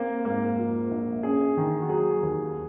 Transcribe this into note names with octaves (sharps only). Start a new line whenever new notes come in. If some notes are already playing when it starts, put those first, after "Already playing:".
Already playing: A#3 C4
G#2 A#3
F3
A#1
C#4 G#4
D#3
F#4
F#3 G#4
D#2